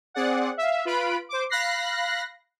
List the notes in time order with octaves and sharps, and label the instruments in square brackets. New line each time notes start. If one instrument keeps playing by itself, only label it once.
[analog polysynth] C4 G#4 D5 F#5
E5 F5
F4 B4 B5 D7
C5 D6
F5 B5 F#6 A#6 C7